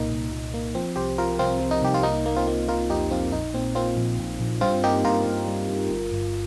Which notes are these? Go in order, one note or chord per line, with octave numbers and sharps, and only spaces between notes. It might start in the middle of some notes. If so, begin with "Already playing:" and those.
Already playing: C2 A#2 A#3 D#4
C2
A#2
A#3
F3 C4
C2 G4 C5
F3 F4 A#4
C2 C4 F4
F3
D#4
C2 G4
F4
A#3 D#4
A#3
C4 F4
A#3
A#3 F4 A#4
F2 D#4 G4
F2 C4 F4
A#1 D#4
A#2 C4
A#3 C4 F4
A#1
A#1
A#1
G2 C4 F4
A#3 D#4 G4
G2 F4 A#4
G2
G3
G2
G1
G1